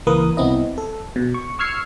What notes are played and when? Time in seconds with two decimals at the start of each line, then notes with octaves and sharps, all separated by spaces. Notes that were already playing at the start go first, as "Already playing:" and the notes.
0.07 C#2 E3 A#3 A#4 B4 D#6
0.37 C2 B3 C4 E4 D#5
0.78 A4
1.16 B2
1.34 C#6
1.59 C#6 E6 F6 G#6 C7 C#7